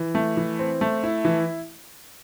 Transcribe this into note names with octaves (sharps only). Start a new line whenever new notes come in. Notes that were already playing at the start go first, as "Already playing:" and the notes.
Already playing: E3
A3
E3
C4
A3
E4
E3